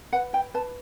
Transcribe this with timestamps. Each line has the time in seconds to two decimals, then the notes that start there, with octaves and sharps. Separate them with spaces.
0.13 B4 F#5
0.33 E4 G5
0.54 B4 A5